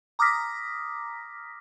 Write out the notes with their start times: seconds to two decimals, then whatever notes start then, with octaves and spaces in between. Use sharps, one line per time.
0.19 A#5 D6 D#6 F6 A#6 B6